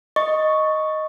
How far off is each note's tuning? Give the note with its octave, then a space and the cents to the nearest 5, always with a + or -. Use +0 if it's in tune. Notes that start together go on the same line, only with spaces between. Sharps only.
D#5 +0 C#6 +0